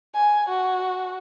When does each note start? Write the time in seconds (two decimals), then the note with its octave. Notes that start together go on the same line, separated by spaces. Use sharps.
0.15 G#5
0.49 F#4